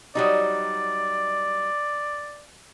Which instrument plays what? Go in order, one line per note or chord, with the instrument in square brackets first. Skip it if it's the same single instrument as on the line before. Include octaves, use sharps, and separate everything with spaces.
[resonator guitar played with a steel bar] F#3 G3 D#4 [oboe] D5